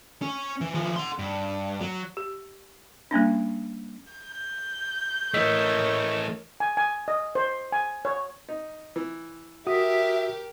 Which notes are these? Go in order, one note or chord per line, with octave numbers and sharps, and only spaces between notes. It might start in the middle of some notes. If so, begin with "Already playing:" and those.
C#4
E3
E3 F3
F#5 C6
G2
F#3
G4
G3 A#3 C#4 D4
G6
E3 A3 A#4 C#5 D#5 E6 B6
G#5
G#5
D#5
C5
G#5
C#5
D#4
E3
F#4 G4 A#4 E5 D#6